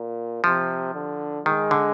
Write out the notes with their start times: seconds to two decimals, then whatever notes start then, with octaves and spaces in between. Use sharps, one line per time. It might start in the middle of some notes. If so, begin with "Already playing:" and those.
Already playing: A#2
0.44 C3 F3
0.94 D3
1.46 D#3 G#3
1.71 D3